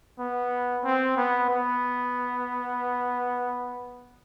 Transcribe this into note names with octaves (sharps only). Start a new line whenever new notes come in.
B3
C4
B3
B3